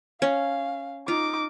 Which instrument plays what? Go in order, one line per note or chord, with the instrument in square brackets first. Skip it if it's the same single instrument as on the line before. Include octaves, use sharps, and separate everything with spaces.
[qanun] C#4 [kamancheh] F5
[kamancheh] D#4 D6 [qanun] F4